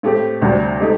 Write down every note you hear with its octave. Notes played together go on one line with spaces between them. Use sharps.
A2 A3 C4 G4
D2 C3 G3 D4 F#4
A3 D#4 G4